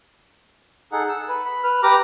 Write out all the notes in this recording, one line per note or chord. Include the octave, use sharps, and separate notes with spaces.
D#4 G#4 A4 F#5
E6
B4
B5
B4 F6
G4 B4 A#5 D6